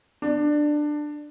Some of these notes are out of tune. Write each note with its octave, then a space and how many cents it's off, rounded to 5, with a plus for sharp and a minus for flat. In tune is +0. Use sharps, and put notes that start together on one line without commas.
D4 +15